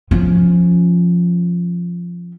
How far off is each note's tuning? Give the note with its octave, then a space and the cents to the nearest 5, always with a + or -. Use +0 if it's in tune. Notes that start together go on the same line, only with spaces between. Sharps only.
F3 +0 C#4 +0